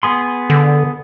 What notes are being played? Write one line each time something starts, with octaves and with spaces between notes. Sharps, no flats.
B3 G#4 C6
D3